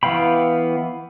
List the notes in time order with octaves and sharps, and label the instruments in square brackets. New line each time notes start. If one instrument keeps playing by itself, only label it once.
[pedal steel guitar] E3 B3 F5 G5 B5